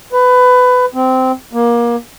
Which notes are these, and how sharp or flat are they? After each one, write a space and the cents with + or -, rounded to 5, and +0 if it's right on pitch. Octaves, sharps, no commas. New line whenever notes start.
B4 +20
C4 -15
A#3 +25